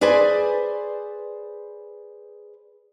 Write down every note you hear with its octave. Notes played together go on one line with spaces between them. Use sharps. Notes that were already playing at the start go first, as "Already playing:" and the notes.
G#4 B4 C5 D5 G#5